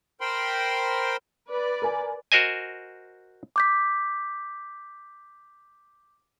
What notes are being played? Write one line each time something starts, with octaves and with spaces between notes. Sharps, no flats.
A#4 C5 G5 B5 C6
B4 D5
A#4 G#5
F#4 A#4 C5 D#5 G#5
D6 G6 B6